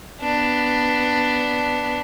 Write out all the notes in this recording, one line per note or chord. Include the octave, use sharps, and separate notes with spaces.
B3 D4